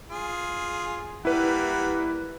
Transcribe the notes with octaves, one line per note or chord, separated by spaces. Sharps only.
F4 G#4
G3 A#3 E4 B4 F#5